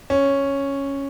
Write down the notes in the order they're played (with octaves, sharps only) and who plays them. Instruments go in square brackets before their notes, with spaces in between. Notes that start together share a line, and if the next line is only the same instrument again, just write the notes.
[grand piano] C#4